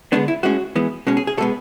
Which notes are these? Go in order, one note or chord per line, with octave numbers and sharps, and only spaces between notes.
D3 G#3 B3 D4
E4
A2 G#3 C#4 F#4
E3 G#3 B3
B2 G#3 C#4
G#4
G#4
B2 G#3 B3 A4